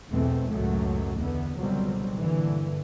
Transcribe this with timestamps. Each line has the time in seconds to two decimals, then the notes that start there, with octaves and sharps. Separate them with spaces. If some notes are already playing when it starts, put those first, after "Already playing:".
0.11 B1 E2 E3 A3 C4
0.52 C#2 F#2 A2 F#3 A3
1.17 E2 D3 B3
1.56 C#2 B2 D3 F#3 G3 C4
2.17 G2 A#2 D3 E3